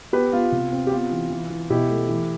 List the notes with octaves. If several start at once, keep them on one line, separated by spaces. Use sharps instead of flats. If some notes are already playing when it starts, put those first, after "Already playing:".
B3 G4 B4
B3 F4
C3
C4
G4
B3 F4
E3
E3
E3
B2 E4 G4
A3
E3